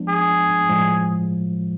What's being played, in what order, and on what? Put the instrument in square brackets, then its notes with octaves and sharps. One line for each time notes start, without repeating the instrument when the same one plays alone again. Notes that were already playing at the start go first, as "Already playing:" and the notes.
Already playing: [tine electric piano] F3 G#3 B3 D4
[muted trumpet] G#4
[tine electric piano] A2 F3 G#3